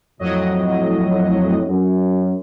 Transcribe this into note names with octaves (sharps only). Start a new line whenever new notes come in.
F2 A2 F#3 D#5
F#2